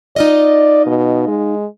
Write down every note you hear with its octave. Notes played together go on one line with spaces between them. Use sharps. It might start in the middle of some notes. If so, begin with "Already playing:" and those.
D#4 F4 D5 D#5
B2
G#3